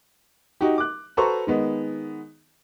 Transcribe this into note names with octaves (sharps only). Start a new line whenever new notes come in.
D#4 F#4 G4
D6 F#6
F#4 A4 B4 C5 A#5 C#6
D#3 G#3 B3